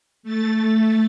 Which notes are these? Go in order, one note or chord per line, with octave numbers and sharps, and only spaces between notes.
A3 A6